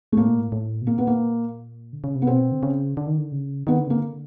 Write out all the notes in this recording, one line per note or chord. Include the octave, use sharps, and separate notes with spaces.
A3
A2 A#3
A#2
A2
A2
B2
A#2 A#3
B3
A#3
D3
C#3
C3
B3
B2 C4
D3
C#3
D3
D#3
D3
C#3
D#3 B3
D3
C#3 A#3
D3